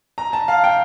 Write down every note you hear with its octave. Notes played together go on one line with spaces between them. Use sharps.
A#5
A5
F5
G5